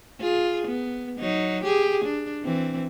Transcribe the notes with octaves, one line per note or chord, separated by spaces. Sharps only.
F4 G#4
B3
F#3 D#4
G4 G#4
D4
E3 C4